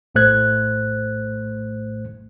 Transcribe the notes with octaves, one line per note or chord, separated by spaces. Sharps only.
A#1 A2 A3 C5 F#6 G#6